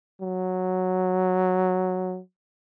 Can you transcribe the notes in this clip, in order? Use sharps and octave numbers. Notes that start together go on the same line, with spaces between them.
F#3